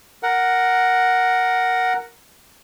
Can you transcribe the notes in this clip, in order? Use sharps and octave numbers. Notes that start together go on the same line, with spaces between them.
A#4 F#5